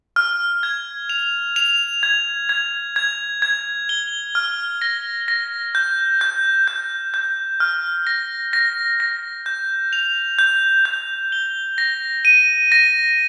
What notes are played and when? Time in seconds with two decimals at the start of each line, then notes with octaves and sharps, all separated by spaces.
0.16 F6
0.63 G#6
1.09 F7
1.56 F7
2.03 G#6
2.49 G#6
2.96 G#6
3.42 G#6
3.89 G7
4.35 F6
4.82 A#6
5.28 A#6
5.75 G6
6.21 G6
6.68 G6
7.14 G6
7.60 F6
8.07 A#6
8.53 A#6
9.00 A#6
9.46 G6
9.93 F7
10.39 G6
10.85 G6
11.32 G7
11.78 A#6
12.25 D#7
12.72 A#6